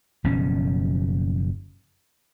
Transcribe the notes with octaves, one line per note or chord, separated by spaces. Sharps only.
F#1 B2 F3 C#4